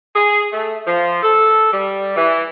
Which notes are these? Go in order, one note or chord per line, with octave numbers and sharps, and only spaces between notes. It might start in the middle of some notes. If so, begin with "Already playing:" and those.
G#4
A3
F3
A4
G3
E3